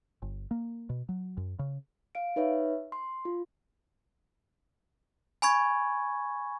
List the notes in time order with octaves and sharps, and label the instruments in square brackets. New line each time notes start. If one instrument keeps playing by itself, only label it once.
[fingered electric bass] G1
A#3
B2
F#3
F#2
C#3
[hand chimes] F5 D7
D#4 B4 C#5 E5
C6
F4
[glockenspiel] G#5 B5 C#6 G#6